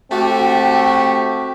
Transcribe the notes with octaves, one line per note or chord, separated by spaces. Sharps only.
A3 C4 F#4 G4